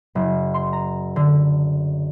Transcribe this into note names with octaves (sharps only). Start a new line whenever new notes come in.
F#1
C6
A#5
D3